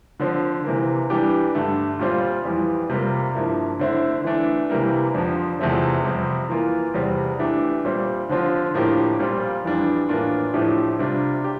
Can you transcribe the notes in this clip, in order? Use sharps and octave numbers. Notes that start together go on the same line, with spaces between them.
D3 F3 C4
C3 E3 A#3
E3 G3 D4 G4
G2 D3 A3
A#2 G3 C4 F4
F2 E3 G3
C3 G3 A#3 F4
G2 F3 A#3 E4
D3 A3 C4 E4
E3 A3 D4
C3 E3 G3 A#3
F2 D3 F3
E2 C3 F3 A3 C4
F2 C3 G3
E3 A#3 F4
E2 C3 G3 C4
E3 A3 D4 G4
A#2 G3 C4
D3 F3 C4 F4
A2 F3 A#3 D4 G4
A#2 G3 C4 F4
F2 E3 G3 D4
A2 E3 A#3 D4 F4
A2 F3 A3 D4 G4
C3 G3 D4 F4
G4